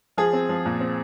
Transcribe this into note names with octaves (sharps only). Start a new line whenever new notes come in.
F3 G#4
C4
F3
A#2
C4